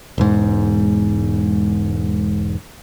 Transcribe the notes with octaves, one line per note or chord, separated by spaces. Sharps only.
E1 G#2